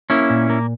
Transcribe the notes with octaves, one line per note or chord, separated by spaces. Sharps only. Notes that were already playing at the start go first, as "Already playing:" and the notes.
A#3 C#4 E4
A#2
A#3